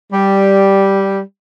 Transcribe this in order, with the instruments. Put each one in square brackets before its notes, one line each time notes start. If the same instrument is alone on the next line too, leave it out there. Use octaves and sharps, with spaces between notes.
[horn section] G3